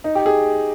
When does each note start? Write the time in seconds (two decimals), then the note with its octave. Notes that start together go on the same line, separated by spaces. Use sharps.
0.04 D#4
0.15 G4
0.26 G#4